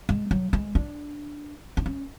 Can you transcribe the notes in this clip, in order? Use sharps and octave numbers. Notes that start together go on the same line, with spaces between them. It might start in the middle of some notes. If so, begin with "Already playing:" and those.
G#3
F#3
G#3
D4
D4
C#4